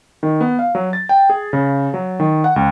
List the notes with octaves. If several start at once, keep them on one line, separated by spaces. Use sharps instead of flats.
D#3
B3
F5
F#3
A6
G5
G#4
C#3
F#3
D#3
F#5
C#2